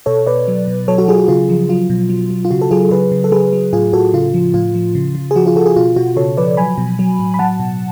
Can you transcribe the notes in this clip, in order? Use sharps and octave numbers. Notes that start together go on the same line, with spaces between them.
B2 A4 C#5
B2 B4 D5
F#3
B2
F#3 A4 C#5
F#4 A4
F#3 F4 G#4
F#4
C#3 F4 G#4
F3
F#3 F4
B2
F#3
F#3
F4
C#3 F#4
A4
F#3 F4 G#4
C#3 G#4 B4
C#3
A4
F#3 G#4 B4
F#3
A2 F4 G#4
A2 F#4 A4
C#3 F4
F3
A2 F4
F3
C#3
C#3
G#4
F3 F#4
F4 G#4
F3 F#4 A4
F4 G#4
B2 F4
B2 F#4
C#3 A4 C#5
F3 B4 D5
F#3 G#5 B5
B2
F#3
A2
B5
F#3 F#5 A5
B2